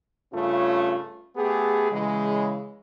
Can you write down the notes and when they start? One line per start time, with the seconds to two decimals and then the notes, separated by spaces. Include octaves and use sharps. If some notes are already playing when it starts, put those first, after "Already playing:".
0.33 G2 C#3 A3 C#4 F4
1.36 A3 B3 G4 G#4
1.91 C#3 E3 G#3